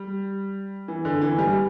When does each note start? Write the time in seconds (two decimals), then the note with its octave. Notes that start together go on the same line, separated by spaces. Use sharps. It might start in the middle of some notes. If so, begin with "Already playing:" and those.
Already playing: G3
0.88 E3
1.05 D3
1.22 E3
1.38 G3